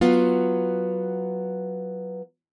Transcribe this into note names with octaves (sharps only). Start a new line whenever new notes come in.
F#3 B3 F4